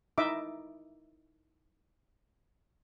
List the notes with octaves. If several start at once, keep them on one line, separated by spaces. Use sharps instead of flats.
D#4 E4 D#5 E5 D6